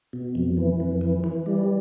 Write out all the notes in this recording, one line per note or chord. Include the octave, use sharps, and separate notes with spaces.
B2
F2
E3
F2
E3
E3
G3